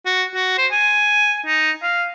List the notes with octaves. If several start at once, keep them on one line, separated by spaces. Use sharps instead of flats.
F#4
F#4
C5
G#5
D#4
F5